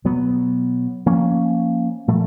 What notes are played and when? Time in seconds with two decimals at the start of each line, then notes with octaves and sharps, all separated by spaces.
0.05 B2 F#3 B3
1.06 F3 A#3 C#4
2.08 A#2 F3 A3